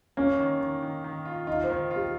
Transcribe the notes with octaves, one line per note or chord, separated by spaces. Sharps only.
A#3 C#4
D#3
D#3
D#3
D#3
F4
D#4 F4
C5
D#3
F4
G4